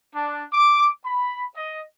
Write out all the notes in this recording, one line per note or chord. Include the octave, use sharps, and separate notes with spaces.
D4
D6
B5
D#5